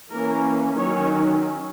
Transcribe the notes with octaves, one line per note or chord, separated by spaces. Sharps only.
E3 A#3 C#4 A#4
D#3 F#3 C#4 C#5